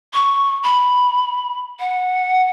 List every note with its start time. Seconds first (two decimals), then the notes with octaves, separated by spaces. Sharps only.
0.14 C#6
0.63 B5
1.80 F#5